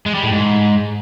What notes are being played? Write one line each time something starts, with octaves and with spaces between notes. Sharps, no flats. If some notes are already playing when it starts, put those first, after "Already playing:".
G#3
G3
A2
G#2